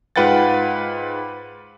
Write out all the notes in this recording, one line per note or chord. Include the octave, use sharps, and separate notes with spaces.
G#2 F4 B4 F#5 G5 A6